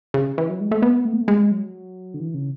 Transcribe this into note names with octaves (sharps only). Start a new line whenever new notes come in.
C#3
E3
F#3
G#3
A3
B3
A3
B3
A3
G#3
F#3
D3
E3
C#3